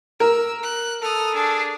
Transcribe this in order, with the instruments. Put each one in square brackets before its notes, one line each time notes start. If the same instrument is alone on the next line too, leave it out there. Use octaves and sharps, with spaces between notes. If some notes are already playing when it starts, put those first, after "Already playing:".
[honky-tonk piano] A#4 [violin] E6
[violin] F#6
[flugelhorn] A4 [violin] D#6 F6
[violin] D4 G#4